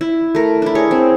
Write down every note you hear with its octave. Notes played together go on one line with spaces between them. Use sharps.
E4
A3 A#4
D4 E4
G#4 C#5
C4